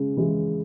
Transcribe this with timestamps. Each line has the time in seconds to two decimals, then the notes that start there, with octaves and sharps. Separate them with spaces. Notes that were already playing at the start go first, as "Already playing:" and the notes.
Already playing: C#3 G#3
0.17 E3 G#3